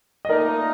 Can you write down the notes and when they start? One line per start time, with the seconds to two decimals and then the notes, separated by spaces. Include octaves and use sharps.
0.25 D#5
0.29 A#2 A3 D#4 A#4 D5